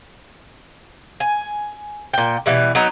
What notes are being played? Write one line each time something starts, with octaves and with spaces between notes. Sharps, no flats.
G#5
A#2 G5
B2 E3 G3
F#3 B3 D#4